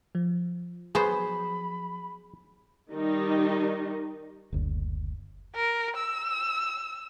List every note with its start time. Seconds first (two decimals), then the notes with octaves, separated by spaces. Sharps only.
0.15 F3
0.95 F#3 B3 G#4 C5 B5
2.90 D#3 G3 D#4
4.52 F#1 D2
5.55 A#4
5.96 E6